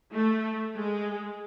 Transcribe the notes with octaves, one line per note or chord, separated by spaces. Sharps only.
A3
G#3